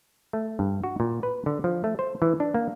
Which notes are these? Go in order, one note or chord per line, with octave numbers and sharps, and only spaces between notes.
A3
G2
F#4
A#2
B4
D3
F3
A3
C5
E3
D4
A#3